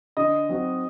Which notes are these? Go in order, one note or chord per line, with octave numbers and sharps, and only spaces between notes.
D3 D#5
F#3 C4 D#4 F#4